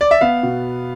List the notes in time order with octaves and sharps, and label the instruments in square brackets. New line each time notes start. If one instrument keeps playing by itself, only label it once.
[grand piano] D5
E5
B3 F5
B2